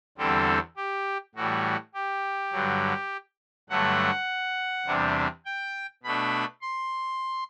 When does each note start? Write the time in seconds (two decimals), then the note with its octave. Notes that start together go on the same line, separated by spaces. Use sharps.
0.18 E2 D3 G3 C4 A4
0.77 G4
1.35 A2 E3 G3 F#4
1.94 G4
2.52 G2 D3 F#3
3.69 G2 D3 F#3 A3 F#5
4.86 E2 C3 G3 D4
5.46 G5
6.03 B2 A3 D4 B5
6.62 C6